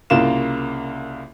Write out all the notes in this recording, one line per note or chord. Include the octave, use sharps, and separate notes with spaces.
C2 C#3 A#3 F4 F5 E7